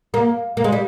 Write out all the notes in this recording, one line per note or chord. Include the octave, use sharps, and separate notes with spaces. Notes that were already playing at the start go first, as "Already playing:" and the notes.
A#3
A#3
G#3
G3